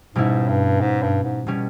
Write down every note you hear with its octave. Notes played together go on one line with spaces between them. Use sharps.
G#2 B2 G3 C#4 E4
G2
G#2
G2
G#2
B2 G3 C#4